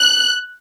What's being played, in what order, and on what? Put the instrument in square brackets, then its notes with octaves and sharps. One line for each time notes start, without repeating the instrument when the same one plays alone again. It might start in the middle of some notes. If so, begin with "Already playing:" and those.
Already playing: [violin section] F#6